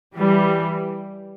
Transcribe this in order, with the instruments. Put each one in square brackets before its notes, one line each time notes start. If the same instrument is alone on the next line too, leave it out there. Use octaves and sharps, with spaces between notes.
[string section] E3 G3